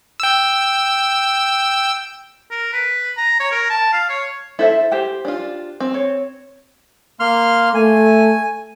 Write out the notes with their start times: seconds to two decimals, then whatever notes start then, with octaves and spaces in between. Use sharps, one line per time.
0.20 G5 E6
2.51 A#4
2.73 B4
3.17 A#5
3.40 C#5
3.51 A#4
3.70 A5
3.93 F5
4.09 C#5
4.59 E4 A4 C5 E5
4.92 G4 C5 G5
5.25 D4 F4
5.80 C4
5.94 C#5
7.20 A#3 C6 F6
7.74 A3 G#5